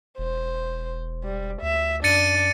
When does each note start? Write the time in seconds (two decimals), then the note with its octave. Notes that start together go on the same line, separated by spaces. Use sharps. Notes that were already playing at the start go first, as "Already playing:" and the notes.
0.18 E1 C5
1.24 G3
1.62 D2 E5
2.04 F#2 D4 A6 C#7 D#7